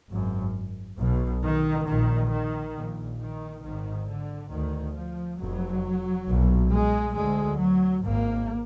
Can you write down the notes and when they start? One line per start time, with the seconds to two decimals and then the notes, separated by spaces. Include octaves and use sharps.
0.11 G#1 F#2
0.99 B1 B2
1.43 D#3
1.87 A#1 A#2 D#3
2.31 D#3
2.75 A#1 A#2
3.20 D#3
3.63 G#1 G#2 D#3
4.08 D3
4.51 D2 D#3
4.95 F3
5.40 F1 F2 F#3
6.28 B1 A#2
6.72 G#3
7.15 D2 G#3
7.60 F#3
8.04 G#1 G#2 A#3